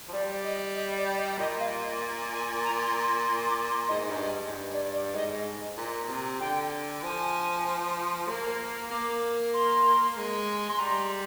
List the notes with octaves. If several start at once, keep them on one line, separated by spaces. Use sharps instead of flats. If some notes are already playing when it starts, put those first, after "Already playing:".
F3
G3 D5
D#5
D#5
D5
D#5
A#2 D#5
F5
G#5
A#5
C6
C6
C6
D6
C6
G#2 D#5
G#2
G2
D#5
G#2
G2
D5
D5
G#2 D#5
A#2
C3
D3 G5
F3 G#5
A#3
A#3 D6
C6
G#3
G#3 C6
G3 A#5